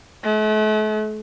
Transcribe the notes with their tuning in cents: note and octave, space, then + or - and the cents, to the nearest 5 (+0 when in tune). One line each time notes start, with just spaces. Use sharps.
A3 -40